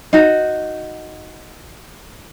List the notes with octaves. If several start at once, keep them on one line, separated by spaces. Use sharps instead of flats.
D#4 F#4